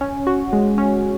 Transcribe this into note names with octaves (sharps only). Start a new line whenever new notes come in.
C#4
F#4
G#3
C#4